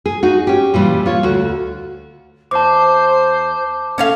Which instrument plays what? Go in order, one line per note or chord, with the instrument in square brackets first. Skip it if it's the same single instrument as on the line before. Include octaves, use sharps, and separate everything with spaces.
[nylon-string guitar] G#4
D#4 F#4
C#4 G4
A#2 E3 G3
F4 C#5
D2 F#4
[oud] E2 [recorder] C5 [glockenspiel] A5 D6
[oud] C#4 A4 F5